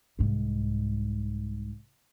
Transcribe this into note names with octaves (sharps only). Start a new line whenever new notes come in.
C2 G#2